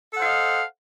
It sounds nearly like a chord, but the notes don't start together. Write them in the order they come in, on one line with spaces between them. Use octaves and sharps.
A4 F#5 C5 F5 D#5